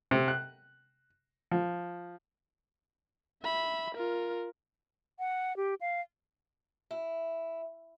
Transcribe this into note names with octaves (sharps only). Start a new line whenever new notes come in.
C3
F#6
F3
E5 B5
F4 A#4
F#5
G4
F5
E4